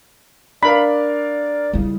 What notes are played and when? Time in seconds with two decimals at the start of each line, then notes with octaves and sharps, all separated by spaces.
0.63 D4 A#4 D5 F5 B5
1.73 F2 C#3 G3 E4